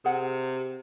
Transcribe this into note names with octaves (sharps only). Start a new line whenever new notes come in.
C3 G#4 F#5